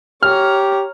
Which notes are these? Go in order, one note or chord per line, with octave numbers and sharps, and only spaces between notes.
G4 C#5 A#5 F6